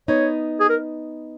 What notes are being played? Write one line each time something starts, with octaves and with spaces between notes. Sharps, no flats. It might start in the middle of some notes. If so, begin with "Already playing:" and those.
B3 D#4 C#5
G#4
A#4